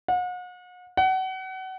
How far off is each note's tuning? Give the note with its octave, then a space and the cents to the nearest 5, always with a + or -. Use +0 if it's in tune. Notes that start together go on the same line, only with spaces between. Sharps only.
F#5 -40
F#5 +30